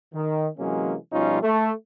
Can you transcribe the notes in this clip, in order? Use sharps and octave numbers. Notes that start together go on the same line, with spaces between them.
D#3
C3 E3 F#3 G#3 A#3 C#4
B2 F3 G3 C#4 D#4 F4
A3